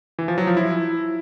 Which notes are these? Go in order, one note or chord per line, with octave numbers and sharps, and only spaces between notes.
E3
F3
F#3
F3
E4